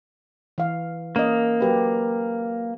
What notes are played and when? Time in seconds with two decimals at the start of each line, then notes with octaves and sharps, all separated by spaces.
0.58 E3 F5
1.16 A#3 C#4 D#5
1.61 F#3 G4 B4